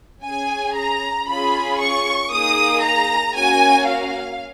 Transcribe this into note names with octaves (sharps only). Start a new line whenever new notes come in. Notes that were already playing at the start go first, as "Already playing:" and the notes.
C#4 G#4 G#5
A#5
C#4 F4 G#4 B5
C#6
A#3 D#4 G#4 D#6
A#5
A#3 C#4 F#4 G#5
F5